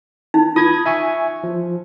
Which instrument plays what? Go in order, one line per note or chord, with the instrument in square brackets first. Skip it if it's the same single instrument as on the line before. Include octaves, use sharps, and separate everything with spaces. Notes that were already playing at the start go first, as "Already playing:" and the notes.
[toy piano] D#4
[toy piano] F4 [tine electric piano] D#6 G#6
[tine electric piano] E5 G#5 C#6
F3